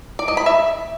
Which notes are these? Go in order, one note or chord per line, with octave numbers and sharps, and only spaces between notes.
D5
D#5
B5
E5